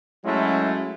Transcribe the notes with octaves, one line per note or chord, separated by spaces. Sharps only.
F#3 G#3 A3 C#4 E4